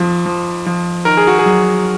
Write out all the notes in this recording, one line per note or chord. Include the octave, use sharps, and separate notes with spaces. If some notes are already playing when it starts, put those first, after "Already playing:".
Already playing: F2 F3
F3
F3
D#3 A#4
G#4
F#4
G#4
F#3